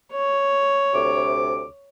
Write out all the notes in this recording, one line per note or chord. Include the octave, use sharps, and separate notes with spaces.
C#5
D2 C3 D6